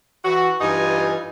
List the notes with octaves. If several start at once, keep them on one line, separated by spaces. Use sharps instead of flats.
E3 F#4
G2 E3 D#4 F4 G#5